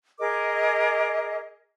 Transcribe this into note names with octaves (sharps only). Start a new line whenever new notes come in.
G#4 A#4 D#5 D6